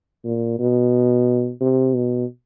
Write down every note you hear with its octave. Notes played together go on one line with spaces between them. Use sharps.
A#2
B2
C3
B2